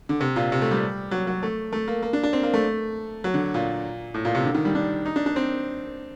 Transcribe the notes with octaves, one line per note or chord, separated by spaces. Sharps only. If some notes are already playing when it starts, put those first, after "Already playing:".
D3
C3
A#2
C3
A3
G3
F#3
F#3
A3
A3
A#3
A#3
D4
D4
C4
A#3
A3
F#3
D3
A#2
A2
A#2
C3
D3
D#3
G3
D4
D#4
D4
D4
C4